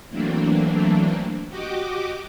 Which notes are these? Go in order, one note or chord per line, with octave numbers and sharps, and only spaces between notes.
E3 F#3 A3 A#3 C4 D4
F#4 G4 D#5 D6